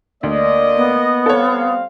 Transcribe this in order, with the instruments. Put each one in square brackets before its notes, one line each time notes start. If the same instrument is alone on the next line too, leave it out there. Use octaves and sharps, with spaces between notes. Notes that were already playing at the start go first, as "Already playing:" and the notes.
[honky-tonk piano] D2 [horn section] A#3 D#5 [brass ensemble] D5
[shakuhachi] B3
[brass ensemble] G3 C4 F5 [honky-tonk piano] A4 C#5